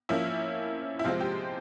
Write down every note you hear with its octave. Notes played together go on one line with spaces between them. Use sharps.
F3 A#3 C#4 E4
E4
C3 F3 G#3 C4 F4
G4